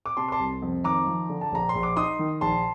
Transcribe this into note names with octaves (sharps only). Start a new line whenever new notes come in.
D6
C3 A5 C6
D6
A5 C6
C2
F2
D#3 A#5 D6
F3
D3
A5
A#1 A#5
C6
A#1
D6
D#4 C6 D#6
D#3
A#1 A5 C6